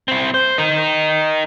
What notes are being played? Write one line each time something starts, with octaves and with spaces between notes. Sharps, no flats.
C4 E4
C5
D#4 A#4